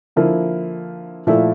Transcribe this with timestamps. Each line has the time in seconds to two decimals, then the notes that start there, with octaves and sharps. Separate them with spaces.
0.16 D3 F3 A#3 E4
1.27 A#2 F3 A3 E4